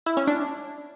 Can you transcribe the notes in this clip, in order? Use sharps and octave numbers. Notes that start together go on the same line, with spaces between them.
E4
C#4
D4